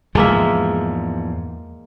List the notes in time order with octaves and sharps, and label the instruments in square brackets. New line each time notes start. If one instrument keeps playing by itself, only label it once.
[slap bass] E2 G#2 F3 [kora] G#3 A#3 E5